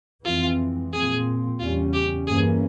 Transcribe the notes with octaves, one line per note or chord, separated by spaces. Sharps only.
F2 E3 G#3 C4 F4
A#2 F3 C4 G#4
E2 C#3 G3 C#4 F4
G4
G2 E3 A#3 C#4 G#4